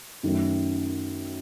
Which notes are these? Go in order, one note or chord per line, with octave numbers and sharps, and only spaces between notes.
F#2 D#3 F#3 A3